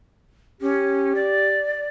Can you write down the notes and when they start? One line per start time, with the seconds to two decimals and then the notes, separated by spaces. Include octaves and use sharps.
0.61 C#4 G4
1.15 D5